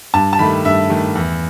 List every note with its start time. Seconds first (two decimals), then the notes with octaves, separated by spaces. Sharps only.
0.14 G2 A5
0.33 A5
0.39 D#3 A3 B5
0.65 G2 E5
0.90 D#3 A3
1.15 E2